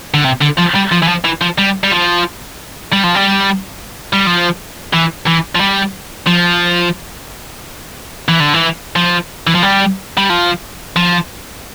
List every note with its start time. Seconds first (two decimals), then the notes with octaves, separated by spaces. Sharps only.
0.14 D3
0.24 C3
0.41 D3
0.57 F3
0.75 G3
0.91 F3
1.02 E3
1.08 F3
1.24 E3
1.41 F3
1.58 G3
1.84 G3
1.92 F3
2.93 G3
3.04 F3
3.15 G3
4.13 G3
4.27 F3
4.93 E3
5.27 E3
5.55 F3
5.60 G3
6.27 F3
8.28 E3
8.40 D3
8.54 E3
8.96 F3
9.47 E3
9.55 F3
9.63 G3
10.18 G3
10.30 F3
10.96 F3